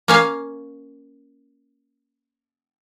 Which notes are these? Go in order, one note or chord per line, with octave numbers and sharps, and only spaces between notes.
A#3 C#4 F5